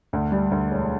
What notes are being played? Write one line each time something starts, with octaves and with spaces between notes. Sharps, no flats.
D2
G3
D2
E1